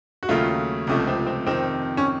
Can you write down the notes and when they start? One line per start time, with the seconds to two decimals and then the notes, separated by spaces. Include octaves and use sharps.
0.23 F#4
0.29 D#2 C#3 F#3 A3 F4
0.87 C#2 C3 F3 A3 C#4
1.07 C4
1.27 C4
1.47 F2 C3 D#3 C4
1.97 C#4